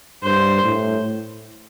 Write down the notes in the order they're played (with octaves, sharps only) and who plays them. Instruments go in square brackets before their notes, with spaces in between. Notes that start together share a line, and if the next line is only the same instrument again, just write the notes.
[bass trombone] G2 [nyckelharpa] C5
[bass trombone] A2